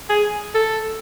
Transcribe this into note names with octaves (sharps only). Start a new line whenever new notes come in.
G#4
A4